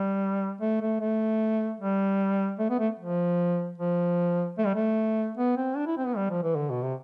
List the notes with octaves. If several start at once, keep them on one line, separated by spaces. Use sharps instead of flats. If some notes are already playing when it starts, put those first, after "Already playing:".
Already playing: G3
A3
A3
A3
G3
A3
B3
A3
F3
F3
A3
G3
A3
B3
C4
D4
E4
C4
B3
G3
F3
E3
D3
B2
C3